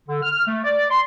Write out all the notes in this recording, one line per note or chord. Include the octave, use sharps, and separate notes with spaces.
D3
F6
A3
D5
C6